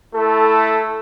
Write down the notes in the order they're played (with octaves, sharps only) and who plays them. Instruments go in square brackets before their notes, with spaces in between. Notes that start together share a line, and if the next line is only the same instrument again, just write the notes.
[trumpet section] A3 E4 A4